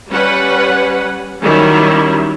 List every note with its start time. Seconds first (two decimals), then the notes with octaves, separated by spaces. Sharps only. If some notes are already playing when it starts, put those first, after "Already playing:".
0.10 G3 C#4 B4 F#5
1.41 D#3 F#3 G3 C#4 E4